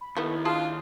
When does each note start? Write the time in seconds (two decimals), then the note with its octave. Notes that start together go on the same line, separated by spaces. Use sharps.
0.01 B5
0.17 D#2 D#3 A3 B3 E4
0.45 D4 D#4 F4 G#4 A5